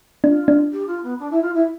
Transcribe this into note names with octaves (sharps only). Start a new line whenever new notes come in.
D4 F4
D4
G4
F4
B3
D4
E4
F4
E4